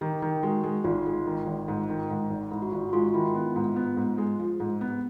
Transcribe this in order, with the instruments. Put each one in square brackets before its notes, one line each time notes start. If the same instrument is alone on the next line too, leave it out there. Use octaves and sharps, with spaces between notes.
[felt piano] D#3 [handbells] G4
[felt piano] D#3
[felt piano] G#3 [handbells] F#4
[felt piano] G#3
[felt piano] G#1 [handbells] F4
[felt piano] G#3
D#3
G#1
G#2
D#3
G#2
G#1
[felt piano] G#2 [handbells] E4
[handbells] F#4
[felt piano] G#1 [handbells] F4
[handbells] F#4
[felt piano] G#3 [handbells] F4
[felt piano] D#3 [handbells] E4
[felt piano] B3 [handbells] F4
[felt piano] G#2
B3
G#2
G#3
F3
G#2
B3
[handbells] G4